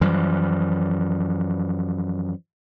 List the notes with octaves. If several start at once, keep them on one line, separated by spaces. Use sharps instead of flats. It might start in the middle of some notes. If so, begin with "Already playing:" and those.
F#2 E3 F3 G3